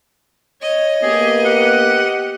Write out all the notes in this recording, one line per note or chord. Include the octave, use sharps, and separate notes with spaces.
C#5 D#5
A#3 B3 D4 G4 G#4
G4 F#5